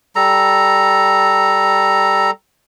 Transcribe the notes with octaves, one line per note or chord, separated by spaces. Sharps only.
G3 A4 A#5